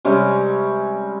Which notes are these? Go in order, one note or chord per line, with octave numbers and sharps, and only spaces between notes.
C3 G3 G#3 C#4